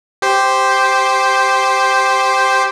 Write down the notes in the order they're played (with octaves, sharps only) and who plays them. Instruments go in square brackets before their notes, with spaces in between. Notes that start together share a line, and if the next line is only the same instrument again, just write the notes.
[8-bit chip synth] G4 C5